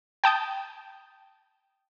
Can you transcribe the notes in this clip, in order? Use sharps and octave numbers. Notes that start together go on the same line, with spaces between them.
G5 A5 D#6 G6